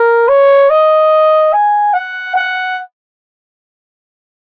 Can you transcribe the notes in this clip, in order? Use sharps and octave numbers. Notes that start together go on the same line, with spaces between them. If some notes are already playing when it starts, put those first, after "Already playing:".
Already playing: A#4
C#5
D#5
G#5
F#5
F#5